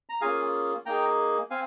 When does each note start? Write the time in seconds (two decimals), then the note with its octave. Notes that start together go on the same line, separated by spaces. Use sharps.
0.09 A#5
0.21 A#3 C#4 F4 G#4 F5 G#5
0.86 A#3 D#4 G#4 G5 A#5
1.51 C4 F5 G#5